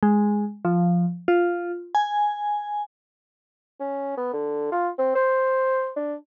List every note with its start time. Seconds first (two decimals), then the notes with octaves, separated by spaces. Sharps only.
0.03 G#3
0.65 F3
1.28 F4
1.95 G#5
3.80 C#4
4.17 B3
4.33 D3
4.72 F4
4.98 C4
5.15 C5
5.96 D4